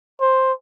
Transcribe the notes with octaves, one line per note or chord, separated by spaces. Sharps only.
C5